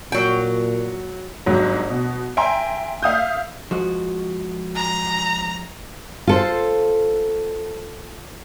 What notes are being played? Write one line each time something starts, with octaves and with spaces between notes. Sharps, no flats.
A#2 F#3 G5
G1 G#2 F#3
B2
E5 G5 G#5 A#5 C6
E5 F5 D#6 G6
F3 G#3 F#4
A#5
F4 A4 C5